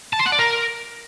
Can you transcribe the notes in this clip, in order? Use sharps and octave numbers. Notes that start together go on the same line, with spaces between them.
A5
C5
F#5
D5
A#4